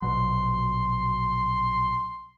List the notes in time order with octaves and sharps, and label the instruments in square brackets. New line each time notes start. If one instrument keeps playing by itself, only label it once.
[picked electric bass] A#1 B2 F#3 [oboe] C6